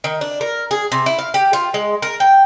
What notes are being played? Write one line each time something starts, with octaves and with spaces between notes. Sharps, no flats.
D#3
D4
A#4
G#4
C3
E4
F5
G4
F4
G#3
A#4
G5